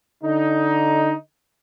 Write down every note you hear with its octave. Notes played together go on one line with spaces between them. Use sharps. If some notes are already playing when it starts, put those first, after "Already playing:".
D3 D#4